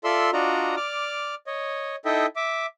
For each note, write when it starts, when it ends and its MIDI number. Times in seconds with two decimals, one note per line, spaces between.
0.04 0.30 65
0.04 0.30 69
0.04 0.30 74
0.04 0.30 76
0.04 0.30 84
0.04 0.30 88
0.33 0.75 62
0.33 0.75 65
0.33 0.75 66
0.33 0.75 74
0.33 0.75 75
0.33 0.75 82
0.76 1.35 74
0.76 1.35 86
0.76 1.35 89
1.47 1.96 73
1.47 1.96 75
2.05 2.26 63
2.05 2.26 64
2.05 2.26 69
2.05 2.26 75
2.05 2.26 76
2.05 2.26 79
2.36 2.66 76
2.36 2.66 86